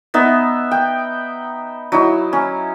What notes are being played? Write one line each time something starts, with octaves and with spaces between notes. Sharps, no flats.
B3 D#4 B4 E5
G5
F#3 D#4 E4
C#4